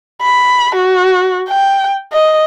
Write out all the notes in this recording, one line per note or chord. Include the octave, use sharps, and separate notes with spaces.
B5
F#4
G5
D#5